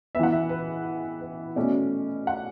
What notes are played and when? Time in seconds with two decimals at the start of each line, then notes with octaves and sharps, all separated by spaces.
0.15 B3 E5
0.19 E3 F#5
0.32 E5
0.49 B4
1.21 B4
1.56 B2 A3 C#4 D5
2.27 F#5